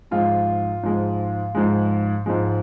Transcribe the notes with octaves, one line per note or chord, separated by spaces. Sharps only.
G#2 F3 G#3 F4
G#2 F3 G#3
G#2 F3 G#3
G#2 F3 G#3